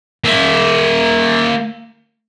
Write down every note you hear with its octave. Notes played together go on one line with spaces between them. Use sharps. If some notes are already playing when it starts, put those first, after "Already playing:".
A#3 E5